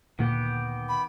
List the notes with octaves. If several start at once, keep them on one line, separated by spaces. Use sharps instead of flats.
D2 A#2 D#3 A#3 B3 G4
B5